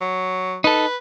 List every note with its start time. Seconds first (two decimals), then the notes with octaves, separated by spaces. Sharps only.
0.01 F#3
0.64 D#4 A4 B4